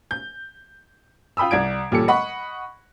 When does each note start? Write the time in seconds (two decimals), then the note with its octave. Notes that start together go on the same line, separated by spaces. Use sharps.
0.11 G6
1.37 F4 G5 B5 D#6 E6
1.51 C2 D5 G#6 D7
1.91 E1 A#2 G3 G4 A4 C#7
2.08 D#5 F#5 B5 C#6